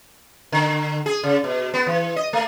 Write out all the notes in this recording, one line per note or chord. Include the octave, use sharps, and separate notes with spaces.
D3
G#4
C#3
B2
B3
E3
D#5
A3